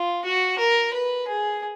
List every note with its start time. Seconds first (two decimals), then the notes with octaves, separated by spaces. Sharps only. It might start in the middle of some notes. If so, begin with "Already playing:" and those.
Already playing: F4
0.25 F#4
0.59 A#4
0.93 B4
1.28 G#4